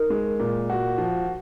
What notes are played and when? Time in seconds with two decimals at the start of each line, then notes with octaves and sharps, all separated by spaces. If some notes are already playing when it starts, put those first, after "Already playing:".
Already playing: D#4 A#4
0.10 G#3
0.40 A#2
0.70 F#4
0.98 F3